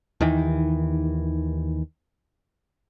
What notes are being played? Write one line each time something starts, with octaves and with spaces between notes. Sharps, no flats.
D#2 D#3 E3